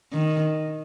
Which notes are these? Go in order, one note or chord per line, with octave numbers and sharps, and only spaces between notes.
D#3